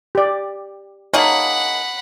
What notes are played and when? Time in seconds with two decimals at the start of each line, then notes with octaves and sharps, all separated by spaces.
0.15 G4 D5
1.14 A#3 D#4 G#4 C#5 F5 F#5 A5 B5